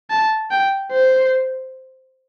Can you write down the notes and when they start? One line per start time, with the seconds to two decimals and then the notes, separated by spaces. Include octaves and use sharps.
0.10 A5
0.51 G5
0.92 C5